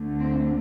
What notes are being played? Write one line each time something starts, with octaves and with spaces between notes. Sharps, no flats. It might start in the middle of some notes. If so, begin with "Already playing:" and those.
Already playing: D2 D3 A3
C4